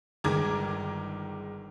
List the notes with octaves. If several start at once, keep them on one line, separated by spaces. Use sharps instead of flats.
G1 D#3 G#3 A#5 D6 G#6